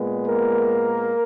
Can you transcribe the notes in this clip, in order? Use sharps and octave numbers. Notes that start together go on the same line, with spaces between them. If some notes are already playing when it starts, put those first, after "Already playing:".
Already playing: A#2 G#3 B3
A#3 A#4